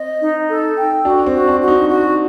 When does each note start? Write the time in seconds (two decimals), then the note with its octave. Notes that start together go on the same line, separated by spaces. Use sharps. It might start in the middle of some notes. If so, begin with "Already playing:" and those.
Already playing: C4 D#5
0.21 D#4
0.49 A4
0.77 G5
1.05 D4 F#4
1.26 C4
1.33 F#4
1.48 D4
1.61 F#4
1.68 D#4
1.89 F#4